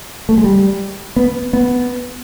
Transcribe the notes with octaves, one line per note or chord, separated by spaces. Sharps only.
A3
G#3
G3
B3
B3